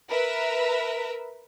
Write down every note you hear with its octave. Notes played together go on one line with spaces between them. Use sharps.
A#4 B4 E5